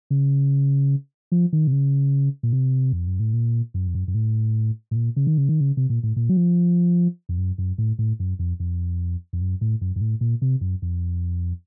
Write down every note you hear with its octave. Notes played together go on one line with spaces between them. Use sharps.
C#3
F3
D#3
C3
C#3
A#2
C3
F2
F#2
A2
A#2
F#2
F2
F#2
F#2
A2
A2
A#2
C#3
D#3
C#3
D#3
C#3
C3
A#2
A2
A#2
F#3
F3
F2
F#2
F#2
A2
A2
F#2
F2
F2
F2
F#2
A2
F#2
F#2
A2
A#2
C3
F#2
F2